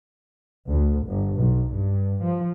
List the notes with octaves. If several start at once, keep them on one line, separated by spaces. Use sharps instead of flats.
D2
G1
B1
G2
F3